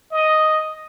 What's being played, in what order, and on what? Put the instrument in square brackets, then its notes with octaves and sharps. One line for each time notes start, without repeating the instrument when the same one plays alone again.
[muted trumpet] D#5